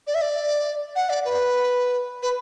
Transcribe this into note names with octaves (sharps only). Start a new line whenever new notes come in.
D5
E5
D5
F#5
D5
B4
B4